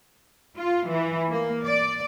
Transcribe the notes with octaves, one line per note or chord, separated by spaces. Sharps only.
F4
E3
A#3
D5